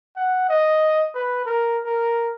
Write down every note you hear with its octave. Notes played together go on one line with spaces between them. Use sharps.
F#5
D#5
B4
A#4
A#4